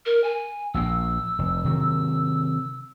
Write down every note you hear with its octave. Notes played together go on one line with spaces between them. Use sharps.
A#4
G#5
A#1 A#2 E6
F1
C3 D#3 F#3